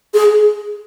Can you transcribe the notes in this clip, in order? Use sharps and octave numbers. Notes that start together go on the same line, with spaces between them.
G#4